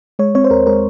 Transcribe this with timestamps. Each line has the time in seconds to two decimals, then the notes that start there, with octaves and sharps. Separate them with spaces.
0.19 G#3 C#5
0.35 C4 C#5
0.44 C5
0.50 D#2 A#4
0.67 G#3 A#4